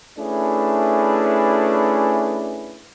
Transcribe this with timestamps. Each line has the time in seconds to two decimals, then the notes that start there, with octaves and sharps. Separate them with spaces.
0.18 A3 C#4 D4 E4 G#4 B4